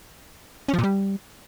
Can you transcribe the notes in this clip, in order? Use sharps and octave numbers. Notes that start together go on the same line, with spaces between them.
C#4
F3
A#2
G3